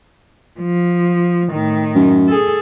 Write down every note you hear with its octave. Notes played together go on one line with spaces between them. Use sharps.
F3
A2 D#3
F#2
G#4 A4